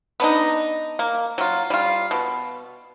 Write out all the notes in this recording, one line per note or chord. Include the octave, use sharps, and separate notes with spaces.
B3 D4 D#4
A#3
F#3 F4
G3 F4
B2